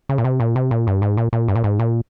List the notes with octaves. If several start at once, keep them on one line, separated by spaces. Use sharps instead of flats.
C#3
A#2
C3
A#2
C3
A#2
G2
G#2
A#2
A#2
G2
A#2
G#2
A#2